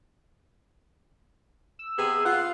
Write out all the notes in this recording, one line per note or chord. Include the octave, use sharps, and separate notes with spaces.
E6
C3 B3 G#4
F4 F#5